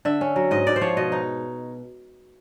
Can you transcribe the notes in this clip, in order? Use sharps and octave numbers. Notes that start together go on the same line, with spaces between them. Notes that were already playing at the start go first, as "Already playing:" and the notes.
D3 E5
C#4
F#3
G#2 D#5
G#2 D5
C5
F3 C#5
B2 D#5
D#4